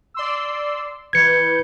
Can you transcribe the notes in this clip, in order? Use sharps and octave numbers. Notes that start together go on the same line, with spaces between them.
D5 C6 E6
E3 B4 G6 G#6 C#7